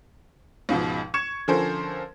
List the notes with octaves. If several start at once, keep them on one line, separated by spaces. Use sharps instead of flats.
C#2 G#2 B2 F3
C#6 G#6 C#7 E7
D3 F3 C#4 A4 A#4 C5